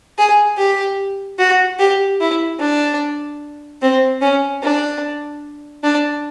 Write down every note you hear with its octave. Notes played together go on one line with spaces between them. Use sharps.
G#4
G4
F#4
G4
E4
D4
C4
C#4
D4
D4